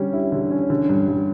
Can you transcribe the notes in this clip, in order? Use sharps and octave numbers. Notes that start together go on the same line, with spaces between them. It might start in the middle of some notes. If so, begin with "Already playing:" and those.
Already playing: D3 G3 C#4
E4
D3
C#4
D3
G2
G2